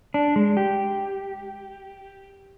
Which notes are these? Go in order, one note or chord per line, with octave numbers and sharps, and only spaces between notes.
D4
G#3
G4